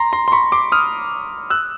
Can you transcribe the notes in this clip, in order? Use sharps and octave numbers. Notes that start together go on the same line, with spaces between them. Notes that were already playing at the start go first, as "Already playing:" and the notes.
Already playing: A#5 C6
A#5 C6
C6
B5 C#6
C6 D6
D#6 F6
E6 F#6